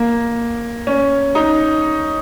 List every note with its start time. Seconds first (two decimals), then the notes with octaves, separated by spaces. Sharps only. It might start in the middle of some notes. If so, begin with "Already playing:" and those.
Already playing: A#3
0.87 C#4
1.35 D#4